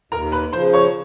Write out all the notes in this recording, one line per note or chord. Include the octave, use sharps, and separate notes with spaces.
D#2 A#4 A#5
B4 B5
C#3 F3 C5 C6
C#5 C#6